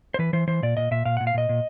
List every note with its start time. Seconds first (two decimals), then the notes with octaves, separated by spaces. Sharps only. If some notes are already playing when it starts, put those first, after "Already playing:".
0.14 C5
0.19 E3 B4
0.33 E3 C5
0.47 E3 C5
0.63 A#2 D5
0.77 A#2 D#5
0.91 A#2 E5
1.05 A#2 F5
1.17 A#2 F#5
1.27 F5
1.34 A#2 D#5
1.49 A#2